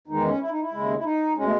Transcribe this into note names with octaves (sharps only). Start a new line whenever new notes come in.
E2 D#3 G#3 D#4
C#4
E4
D#4
E4
D#2 C#3 G#3
E4
D#4
B2 G#3 C#4
A3